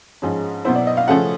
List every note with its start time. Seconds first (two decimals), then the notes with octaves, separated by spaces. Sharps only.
0.22 G#2 F3 G#3 C#4
0.65 B2 F#3 B3 E4 C5
0.76 D5
0.87 D#5
0.97 F5
1.08 C#3 F3 A3 C#4 F#5